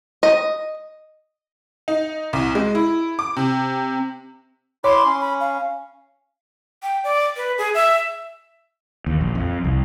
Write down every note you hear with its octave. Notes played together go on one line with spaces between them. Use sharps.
D#5
D#4
C2
G#3
E4
D6
C3
E4 C#5 C6 D6
C#4
B5
F5
G5
D5
B4
G#4
E5
D#2
A#1
F2
C2